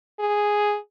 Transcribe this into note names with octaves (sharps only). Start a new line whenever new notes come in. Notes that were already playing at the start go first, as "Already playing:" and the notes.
G#4